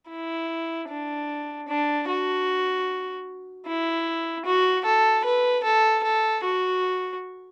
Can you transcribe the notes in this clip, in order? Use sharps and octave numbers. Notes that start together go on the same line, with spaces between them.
E4
D4
D4
F#4
E4
F#4
A4
B4
A4
A4
F#4